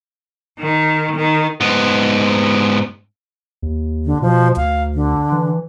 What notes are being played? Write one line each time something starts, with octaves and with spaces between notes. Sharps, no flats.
D#3
D#3
G#2 B3
D#2
D3
B2 F3
D2 F5
D3
E3